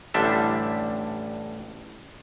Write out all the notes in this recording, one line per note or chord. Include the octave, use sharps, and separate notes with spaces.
A1 D3 G3 D4 E5